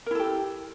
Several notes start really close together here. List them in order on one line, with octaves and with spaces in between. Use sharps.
A#4 E4 A4 G4